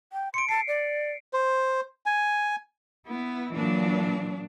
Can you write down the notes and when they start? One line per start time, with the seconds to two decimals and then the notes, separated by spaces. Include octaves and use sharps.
0.13 G5
0.34 C6 C#7 D7
0.49 A5 C7
0.68 D5
1.33 C5
2.06 G#5
3.07 B3 E4
3.53 A#2 E3 F#3 D4